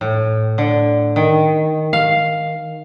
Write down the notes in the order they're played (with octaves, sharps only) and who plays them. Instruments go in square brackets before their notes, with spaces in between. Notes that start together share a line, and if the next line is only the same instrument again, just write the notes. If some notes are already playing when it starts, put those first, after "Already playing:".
[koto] A2
D3
D#3
F5